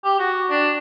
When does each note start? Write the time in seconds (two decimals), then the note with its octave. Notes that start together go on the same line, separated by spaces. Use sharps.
0.04 G4
0.19 F#4
0.50 D4